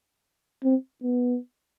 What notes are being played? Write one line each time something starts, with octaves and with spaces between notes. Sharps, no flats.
C4
B3